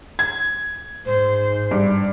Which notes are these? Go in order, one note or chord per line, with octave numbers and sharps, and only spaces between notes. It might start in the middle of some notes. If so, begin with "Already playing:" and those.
G#6
G#2 C5
G2